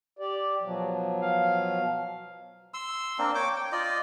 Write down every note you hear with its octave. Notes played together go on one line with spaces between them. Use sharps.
G4 D5
B2 F3 F#3
F5
C6 E6
A#3 C4 D4
C#5 G5 D6
G5
F4 D5 D#5